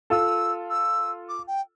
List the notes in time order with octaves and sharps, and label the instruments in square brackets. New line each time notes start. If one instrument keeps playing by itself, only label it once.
[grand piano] F4 A4 [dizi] E6
[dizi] E6
D6
G5